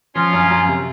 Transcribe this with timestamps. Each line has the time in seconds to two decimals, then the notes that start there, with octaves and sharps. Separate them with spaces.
0.15 F3 C#4 F4
0.33 F#2
0.51 F#2
0.68 C3